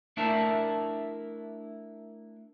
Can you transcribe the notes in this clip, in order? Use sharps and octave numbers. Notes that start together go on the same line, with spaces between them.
A3 D4 E4 A#4 E5 A5